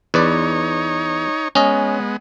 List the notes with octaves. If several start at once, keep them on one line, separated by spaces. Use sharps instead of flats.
E2 D#4 B4 C#5 D5
G#3 B3 C#4 D#5